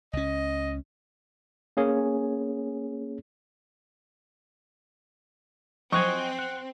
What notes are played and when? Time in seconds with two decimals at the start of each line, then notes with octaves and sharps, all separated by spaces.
0.13 C#2 C#4 D#5
1.77 A#3 C#4 G#4 C#5
5.92 F3 F#3 C4 D#5 F#5 G#5 C#6
6.39 F#5